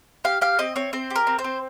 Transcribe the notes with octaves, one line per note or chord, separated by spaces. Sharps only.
G4 F5
G4 F5
C4 D#5
C4 C#5
C4 C5
G4
A#4
C4
C5
C4